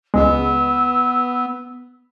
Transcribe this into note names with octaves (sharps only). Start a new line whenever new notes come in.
C#2 G#3 B3 E6